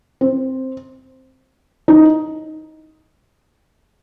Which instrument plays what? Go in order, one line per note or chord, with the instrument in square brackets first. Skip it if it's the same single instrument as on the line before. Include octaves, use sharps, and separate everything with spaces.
[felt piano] C4
D#4